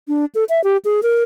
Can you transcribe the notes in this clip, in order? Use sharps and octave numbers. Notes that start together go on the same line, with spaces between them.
D4
A4
E5
G4
G#4
A#4